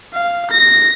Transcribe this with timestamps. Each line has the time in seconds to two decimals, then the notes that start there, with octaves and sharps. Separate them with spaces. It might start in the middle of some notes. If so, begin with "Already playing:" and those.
0.14 F5
0.51 A#6